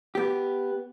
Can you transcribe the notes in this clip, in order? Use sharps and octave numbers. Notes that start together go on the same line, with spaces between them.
B3 G4